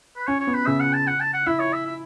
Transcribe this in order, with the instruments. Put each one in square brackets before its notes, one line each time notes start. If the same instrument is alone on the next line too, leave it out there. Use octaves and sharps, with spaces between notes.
[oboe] B4
[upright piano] C#4 [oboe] C#5
[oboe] C#5
[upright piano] B3
[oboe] B4
[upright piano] C#3 [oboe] E5
[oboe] F#5
A5
F#5
A5
F#5
[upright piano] E4 [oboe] E5
[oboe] C#5
E5
E5